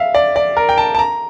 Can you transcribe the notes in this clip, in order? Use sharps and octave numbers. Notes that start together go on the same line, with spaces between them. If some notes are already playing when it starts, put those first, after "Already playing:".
Already playing: E5 F5
D5
D5
A#4
G5
A5
A5
A#5